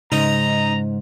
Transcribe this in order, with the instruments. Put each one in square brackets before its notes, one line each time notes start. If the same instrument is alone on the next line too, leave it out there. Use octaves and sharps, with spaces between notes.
[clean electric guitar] G#2 [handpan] C#3 [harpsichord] D#4 [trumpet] A#5